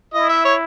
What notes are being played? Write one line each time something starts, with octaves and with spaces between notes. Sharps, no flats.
E4 D#5
E5
C#5